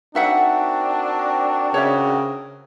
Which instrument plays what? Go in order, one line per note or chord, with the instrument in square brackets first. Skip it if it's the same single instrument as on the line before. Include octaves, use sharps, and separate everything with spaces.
[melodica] C4 F#4 A#4 [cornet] D4 [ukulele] D#4 E5 F#5
[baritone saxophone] C#3 [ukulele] C#5 E5